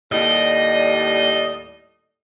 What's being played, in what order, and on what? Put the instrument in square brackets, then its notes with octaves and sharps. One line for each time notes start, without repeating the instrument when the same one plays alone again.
[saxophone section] D#2 A2 G3 [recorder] D5 [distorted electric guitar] D#5